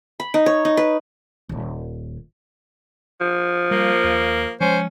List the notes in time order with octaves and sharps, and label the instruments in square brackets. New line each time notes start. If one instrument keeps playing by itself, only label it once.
[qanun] B5
D#4
C#5
D#4
B4
[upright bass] D#1 D#2
[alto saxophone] F3
[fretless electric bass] G3 [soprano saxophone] A#3
[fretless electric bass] D#2
[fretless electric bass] F3 G#3 [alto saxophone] C#4 [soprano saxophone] C5